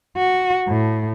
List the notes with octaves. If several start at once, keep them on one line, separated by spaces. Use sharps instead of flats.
F#4
A2